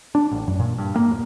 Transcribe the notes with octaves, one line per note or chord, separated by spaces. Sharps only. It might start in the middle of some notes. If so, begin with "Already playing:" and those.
D4
A1
F#2
A#2
G2
A#3
D#1